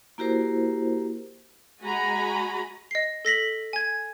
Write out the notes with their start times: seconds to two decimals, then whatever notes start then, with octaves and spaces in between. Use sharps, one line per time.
0.18 A#3 E4 F#4 G4 A#4 C5
1.81 G#3 F#4 G#5 A#5 B5
2.91 D#5 C7
3.25 A4 A#6 B6 F#7
3.73 G#5 G#6